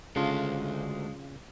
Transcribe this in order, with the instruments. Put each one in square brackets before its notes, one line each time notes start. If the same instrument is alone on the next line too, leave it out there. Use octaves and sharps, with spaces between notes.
[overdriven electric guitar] D2 A4 [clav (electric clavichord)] C#3 F4 [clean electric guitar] G#3